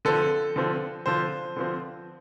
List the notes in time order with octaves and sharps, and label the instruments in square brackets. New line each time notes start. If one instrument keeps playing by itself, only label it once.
[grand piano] D3 F3 C4 A4
D3 F3 C4
D3 F3 C4 C5
D3 F3 C4